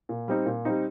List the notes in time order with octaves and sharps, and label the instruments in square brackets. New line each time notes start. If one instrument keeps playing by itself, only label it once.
[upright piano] A#2
G3 C4 D#4
A#2
G3 C4 D#4